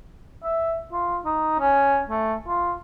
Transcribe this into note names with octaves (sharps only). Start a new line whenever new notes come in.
E5
F4
D#4
C#4
A3
F4